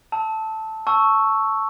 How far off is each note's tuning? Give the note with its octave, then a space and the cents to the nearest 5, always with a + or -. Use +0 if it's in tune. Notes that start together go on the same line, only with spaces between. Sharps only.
A5 +0 E6 -35
A5 +0 C#6 +0 E6 +0